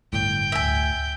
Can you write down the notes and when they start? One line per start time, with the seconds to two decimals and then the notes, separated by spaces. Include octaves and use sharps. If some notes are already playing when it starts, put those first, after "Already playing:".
0.13 G1 A2 G5
0.52 D2 E5 G#5